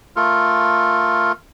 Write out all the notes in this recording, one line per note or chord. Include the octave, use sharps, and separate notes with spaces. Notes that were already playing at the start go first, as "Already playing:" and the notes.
A3 F4 A4 A#4